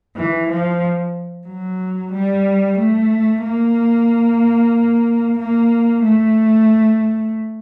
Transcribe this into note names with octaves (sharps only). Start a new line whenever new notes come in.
E3
F3
F#3
G3
A3
A#3
A#3
A3